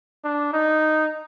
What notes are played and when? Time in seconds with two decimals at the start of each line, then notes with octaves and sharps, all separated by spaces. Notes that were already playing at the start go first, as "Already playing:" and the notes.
0.24 D4
0.53 D#4